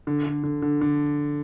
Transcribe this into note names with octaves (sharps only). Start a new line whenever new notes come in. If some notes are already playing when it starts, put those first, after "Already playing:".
D3
D3
D3
D3
D3